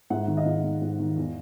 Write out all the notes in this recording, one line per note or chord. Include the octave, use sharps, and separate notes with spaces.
G#2 E5 F#5
D#3
D#5 F5
G#2
D#3
G#2
D#3
E2